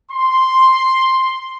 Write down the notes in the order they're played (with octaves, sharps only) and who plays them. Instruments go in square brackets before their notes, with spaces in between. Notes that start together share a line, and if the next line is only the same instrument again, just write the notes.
[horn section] C6